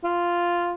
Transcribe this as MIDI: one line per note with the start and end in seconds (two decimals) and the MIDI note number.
0.04 0.75 65